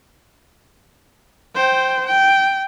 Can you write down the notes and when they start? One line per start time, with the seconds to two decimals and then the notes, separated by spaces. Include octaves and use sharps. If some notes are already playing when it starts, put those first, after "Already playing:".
1.55 C5 G5
2.06 G5